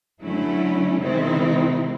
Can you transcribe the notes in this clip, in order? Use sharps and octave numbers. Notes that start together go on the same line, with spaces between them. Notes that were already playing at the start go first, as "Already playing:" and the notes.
D3 F#3 A3 C#4 E4
C3 D#3 G#3 C4 E4